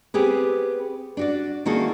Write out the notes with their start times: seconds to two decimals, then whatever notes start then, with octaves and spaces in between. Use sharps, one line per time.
0.14 B3 C4 G4 G#4 B4
1.17 D4 F#4 D5
1.65 D#3 A#3 E4 F#4 G#4 A4